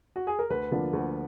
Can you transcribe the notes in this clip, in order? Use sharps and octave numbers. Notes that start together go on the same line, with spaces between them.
F#4
G#4
A#4
D2 B4
D3 F3 A#3 D4
D2